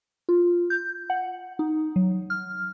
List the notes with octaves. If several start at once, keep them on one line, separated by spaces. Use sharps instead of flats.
F4
G6
F#5
D#4
F#3
F6